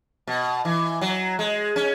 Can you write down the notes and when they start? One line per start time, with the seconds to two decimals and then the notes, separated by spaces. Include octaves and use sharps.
0.27 B2
0.65 E3
1.01 F#3
1.39 G#3
1.76 C#4